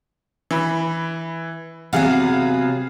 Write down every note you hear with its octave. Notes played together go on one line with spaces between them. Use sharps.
E3 B5
C3 F#3 B3 G#4 F5 F#5